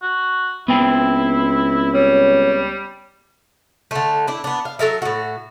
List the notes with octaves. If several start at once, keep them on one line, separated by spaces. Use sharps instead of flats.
F#4
C#2 B3 C4 E4 G5
G3 C#5
D3 A3
D4 E4
B3 D4
F5
F#3 A4 A#4 E5
A2 F#4